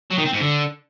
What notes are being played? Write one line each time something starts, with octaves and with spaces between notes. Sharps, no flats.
F#3
D#3
C4
G#2
D3